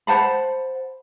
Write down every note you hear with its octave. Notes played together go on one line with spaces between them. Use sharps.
C5 F#5 A5 B5